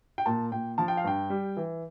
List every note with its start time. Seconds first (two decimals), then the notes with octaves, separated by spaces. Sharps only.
0.18 G5
0.26 A#2 A5
0.52 A#2 G5
0.78 F3 A5
0.88 G5
0.97 F5
1.04 G2 G5
1.30 G3
1.57 E3